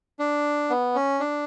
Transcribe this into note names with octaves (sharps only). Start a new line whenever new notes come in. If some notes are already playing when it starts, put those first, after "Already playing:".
D4
B3
C#4
D4